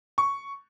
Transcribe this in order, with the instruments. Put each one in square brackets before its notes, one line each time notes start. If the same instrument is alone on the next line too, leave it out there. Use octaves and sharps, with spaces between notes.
[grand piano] C#6